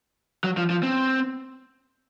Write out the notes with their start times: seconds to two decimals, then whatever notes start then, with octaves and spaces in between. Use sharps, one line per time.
0.44 F#3
0.57 F3
0.70 F3
0.83 C4